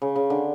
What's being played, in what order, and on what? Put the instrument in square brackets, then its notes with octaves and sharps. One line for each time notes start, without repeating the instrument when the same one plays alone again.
[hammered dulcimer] C#3
C#3
D3